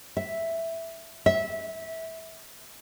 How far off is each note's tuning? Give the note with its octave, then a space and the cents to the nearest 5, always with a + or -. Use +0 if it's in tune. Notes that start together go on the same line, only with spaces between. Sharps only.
E5 +0
E5 -20